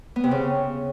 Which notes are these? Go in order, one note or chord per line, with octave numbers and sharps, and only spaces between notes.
B3
C3
C#3